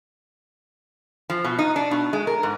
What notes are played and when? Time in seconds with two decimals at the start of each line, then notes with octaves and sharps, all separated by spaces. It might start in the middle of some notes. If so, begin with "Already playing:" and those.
1.30 F3
1.44 B2
1.59 D#4
1.76 D4
1.91 B2
2.13 G#3
2.27 A#4
2.43 G#2